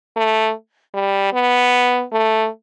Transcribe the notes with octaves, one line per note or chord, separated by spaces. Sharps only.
A3
G3
B3
A3